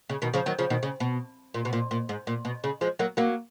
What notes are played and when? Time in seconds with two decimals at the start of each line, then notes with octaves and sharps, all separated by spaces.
0.09 C#3
0.22 B2 D#3
0.34 C#3 F3
0.46 D#3 F#3
0.59 C#3 F3
0.70 B2 D#3
0.83 C#3
1.00 B2
1.54 A#2
1.65 B2
1.73 A#2
1.91 A#2
2.09 G#2
2.27 A#2
2.45 B2
2.64 C#3
2.81 F3 G#3
2.99 F#3 A#3
3.17 F#3 A#3